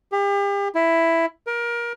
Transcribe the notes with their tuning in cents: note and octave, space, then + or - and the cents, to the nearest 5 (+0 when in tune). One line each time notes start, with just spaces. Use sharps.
G4 +40
E4 +5
A#4 +25